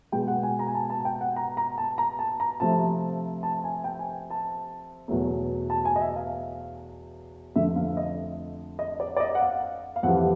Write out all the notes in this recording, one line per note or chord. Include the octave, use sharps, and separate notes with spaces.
B2 G#3 G5
F#5
G#5
A#5
G#5
A5
A5
G5
F#5
A#5
A#5
A5
A#5
A5
A#5
C3 F3 A3 A5
A5
G#5
G5
G#5
A5
E2 B2 F#3 A3
A5
G#5
D#5
E5
F5
F2 D3 F3 A3 E5
F5
E5
D#5
D#5
D5
D5
D#5
F#5
F5
F5
F2 C3 E3 G3 F#5